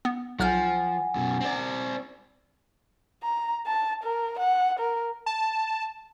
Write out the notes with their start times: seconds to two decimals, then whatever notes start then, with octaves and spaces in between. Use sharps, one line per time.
0.05 B3
0.39 B1 F3 F#5 G#5 F6 G6
1.15 F#2 B2
1.41 C4 D5
3.23 A#5
3.66 A5
4.03 A#4
4.39 F#5
4.79 A#4
5.26 A5